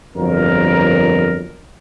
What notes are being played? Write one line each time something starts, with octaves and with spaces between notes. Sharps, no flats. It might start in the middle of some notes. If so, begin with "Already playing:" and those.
G1 F2 F#3 A#4